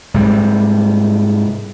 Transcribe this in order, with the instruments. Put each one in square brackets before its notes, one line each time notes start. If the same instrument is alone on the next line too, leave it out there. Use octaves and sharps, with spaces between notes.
[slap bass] G#2 C3 G3